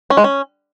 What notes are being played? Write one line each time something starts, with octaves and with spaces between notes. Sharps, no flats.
C#4
G#3
C#4